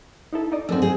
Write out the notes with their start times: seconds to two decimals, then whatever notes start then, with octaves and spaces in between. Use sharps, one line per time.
0.33 D#4 E4 A4
0.52 D#4 D5 D#5
0.69 F#2 C4 F#4 A4 E6
0.82 G#4 C5